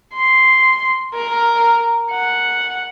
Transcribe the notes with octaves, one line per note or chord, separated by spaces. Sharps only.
C6
A#4
F#5